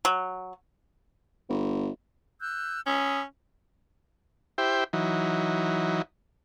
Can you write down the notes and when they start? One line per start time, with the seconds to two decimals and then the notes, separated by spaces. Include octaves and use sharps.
0.05 F#3
1.50 G1
2.40 E6 F#6 G6
2.87 C#4 B5 D#6 E6
4.58 E4 G4 C5 G5
4.93 E3 F#3 D#4